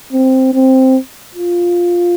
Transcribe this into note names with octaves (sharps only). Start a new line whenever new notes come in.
C4
C4
F4